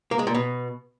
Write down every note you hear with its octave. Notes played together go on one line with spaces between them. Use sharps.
A#3
G#3
A#2
B2